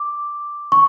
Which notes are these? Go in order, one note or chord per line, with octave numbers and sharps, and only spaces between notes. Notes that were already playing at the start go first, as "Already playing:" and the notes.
Already playing: D6
C#6